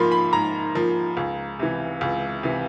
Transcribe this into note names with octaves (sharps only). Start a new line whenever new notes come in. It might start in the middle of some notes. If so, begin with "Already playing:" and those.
Already playing: G#2 F3 A#3 B5 C6
B5
G#2 A#5
F3 A#3
C#2
C3 E3
C#2
C3 E3